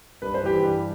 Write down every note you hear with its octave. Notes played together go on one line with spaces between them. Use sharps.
G2 B4
C5
E3 G4 B4
G2